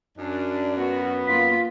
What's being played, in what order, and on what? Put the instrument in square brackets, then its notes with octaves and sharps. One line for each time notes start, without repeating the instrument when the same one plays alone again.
[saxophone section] F#2 [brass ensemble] D4
[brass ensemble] B3 [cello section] F#4
[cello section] A#3 F4 [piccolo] B6